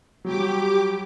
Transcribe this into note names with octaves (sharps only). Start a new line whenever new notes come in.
F#3 G3 G4 D6